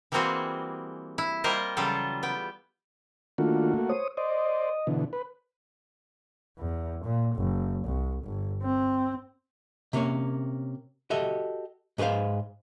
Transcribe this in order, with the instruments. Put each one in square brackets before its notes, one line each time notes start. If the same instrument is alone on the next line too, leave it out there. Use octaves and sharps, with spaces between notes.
[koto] E3 G3 A#3 C4 F#4 G#4
E4
G3 A#3 F4 A#4 C5 D#5
C#3 E3 F#3 G3 F4 A4
B3 G5
[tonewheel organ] D#3 D4 F4 [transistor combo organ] A3 A#3 F#4
[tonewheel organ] C5 C#5 D#6
[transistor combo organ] C5 D5 [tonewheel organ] D#5
[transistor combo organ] B2 D3 E3
B4
[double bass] E2
A#2
F#1
C2
G1
C4
[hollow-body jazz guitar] C3 A#3 C#4 C#5
F#4 G4 A4 D#5 E5
G#2 G#4 B4 C5 F5